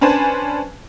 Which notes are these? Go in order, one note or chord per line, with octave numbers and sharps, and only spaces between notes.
C#4 D4 B4 C5 G#5 A5